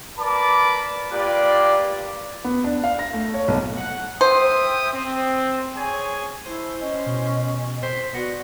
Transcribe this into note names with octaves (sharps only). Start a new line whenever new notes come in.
A#4 B4 D5 A5 B5 D6
A#3 F4 G4 B4 D5
B3
D4
F5
A#6
A3
C#5
B1
F#5
C5 E5 G5 D#6
C4
G#4 C#5 G#5
E4 C5 A5
C#4 D#5 G#5
B2
C5 B6
B3 F#4 D5 A#6